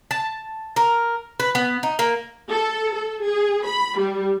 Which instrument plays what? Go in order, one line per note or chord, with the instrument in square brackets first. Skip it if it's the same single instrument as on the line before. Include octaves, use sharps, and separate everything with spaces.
[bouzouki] A5
A#4
B4
B3
D#4
A#3
[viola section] A4
A4
G#4
B5
G3